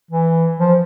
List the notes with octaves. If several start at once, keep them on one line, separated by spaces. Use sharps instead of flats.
E3
F3